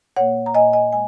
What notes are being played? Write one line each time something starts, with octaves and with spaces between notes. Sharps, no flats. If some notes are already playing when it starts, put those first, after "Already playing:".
A#2 A#3 C#5 F#5
A#5
A#2 A#3 D#5 G#5
D#5 G#5
G#3 G#5